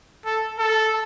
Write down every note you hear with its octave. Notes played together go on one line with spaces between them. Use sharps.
A4
A4